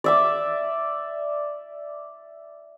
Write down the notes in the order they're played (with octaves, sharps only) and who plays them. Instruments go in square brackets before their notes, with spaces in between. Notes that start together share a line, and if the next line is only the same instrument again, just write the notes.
[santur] D5 E5 D6